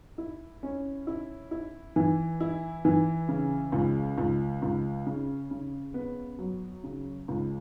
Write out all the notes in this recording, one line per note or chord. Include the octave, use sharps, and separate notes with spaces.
E4
C#4
E4
E4
E3
E4
E3
C#3
C#2
C#2
C#2
C#3
C#3
B3
F#3
C#3
C#2